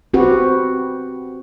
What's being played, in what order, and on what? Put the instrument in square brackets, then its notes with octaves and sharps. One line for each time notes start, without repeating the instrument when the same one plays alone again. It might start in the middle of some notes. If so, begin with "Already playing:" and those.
[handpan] C4 F#4 G4 B4